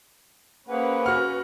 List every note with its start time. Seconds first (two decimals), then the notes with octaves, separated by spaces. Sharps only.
0.69 A#3 C#4 G#4 B4 C5 F#5
1.06 F#4 F6